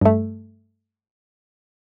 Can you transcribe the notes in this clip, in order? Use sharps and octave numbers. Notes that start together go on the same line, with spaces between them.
G2 A3